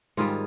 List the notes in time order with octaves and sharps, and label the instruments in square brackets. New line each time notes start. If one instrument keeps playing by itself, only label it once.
[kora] G#2 D#3 G3 F4 G#4